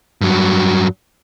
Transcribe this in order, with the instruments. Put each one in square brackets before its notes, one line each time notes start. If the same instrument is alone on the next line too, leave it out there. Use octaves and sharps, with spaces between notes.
[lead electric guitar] G2 F#3